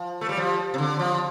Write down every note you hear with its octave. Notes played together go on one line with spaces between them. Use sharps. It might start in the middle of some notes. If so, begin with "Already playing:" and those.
Already playing: F3
A3
G3
F3
C3
D3
F3